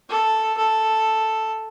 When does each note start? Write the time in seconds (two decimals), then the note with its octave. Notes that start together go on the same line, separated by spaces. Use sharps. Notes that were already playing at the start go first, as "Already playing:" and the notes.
0.09 A4
0.57 A4